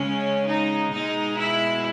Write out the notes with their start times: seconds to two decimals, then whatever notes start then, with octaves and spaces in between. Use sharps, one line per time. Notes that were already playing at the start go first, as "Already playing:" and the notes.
Already playing: C#3 G#3 C#4
0.48 D#4
0.93 B2 G#3 D#4
1.38 E4